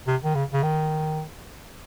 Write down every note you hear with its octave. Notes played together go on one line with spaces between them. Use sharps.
C3
D#3
C#3
C#3
D#3